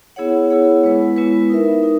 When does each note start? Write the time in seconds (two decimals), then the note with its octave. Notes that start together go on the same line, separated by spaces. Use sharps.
0.16 B3 E4 G#4 C#5 F#5
0.50 B3 E4 G#4 C#5 F#5
0.83 G#3 B3 E4 B4
1.17 G#3 B3 E4 B4
1.50 D#4 A#4 E5
1.83 D#4